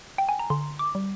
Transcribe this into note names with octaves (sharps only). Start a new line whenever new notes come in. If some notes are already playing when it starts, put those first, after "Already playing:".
G5
G#5
A#5
D3 C6
D6
G3